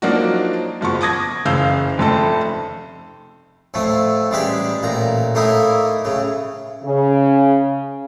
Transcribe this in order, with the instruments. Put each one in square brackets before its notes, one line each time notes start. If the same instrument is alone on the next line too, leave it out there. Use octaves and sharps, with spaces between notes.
[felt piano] F3 F#3 A#3 D4 D#4 F#4
F#1 F3 B3 C#6
A5 D6 D#6 G#6 A#6
F#1 C#3 E3 F5 E6 G6
F1 F2 A3 A4
[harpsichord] F2 A2 A3
A1 G3 G#3 D4 G4 B5
A1 A#2 A#5
A2 A3 A#3 D#4 E4
A2 C#3
[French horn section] C#3